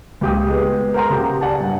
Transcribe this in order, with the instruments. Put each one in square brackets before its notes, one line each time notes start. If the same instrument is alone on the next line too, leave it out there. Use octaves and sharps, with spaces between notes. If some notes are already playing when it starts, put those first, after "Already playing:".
[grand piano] C#2 G4 D#6
G#3 B3
A#4 C5 F#5 A#5 C6
C#3 G4
D5 F#5 G#5 A5
G2